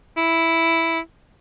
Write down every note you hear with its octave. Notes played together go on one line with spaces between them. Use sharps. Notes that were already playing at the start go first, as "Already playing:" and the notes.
E4